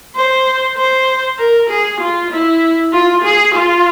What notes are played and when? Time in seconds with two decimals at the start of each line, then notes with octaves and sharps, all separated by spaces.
0.15 C5
0.77 C5
1.38 A#4
1.69 G#4
2.00 F4
2.31 E4
2.93 F4
3.24 G#4
3.54 F4